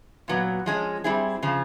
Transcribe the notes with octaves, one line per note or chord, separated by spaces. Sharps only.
A#2 F#3 B3
F3 G#3 C#4
G3 C4 E4 G#4
C#3 F3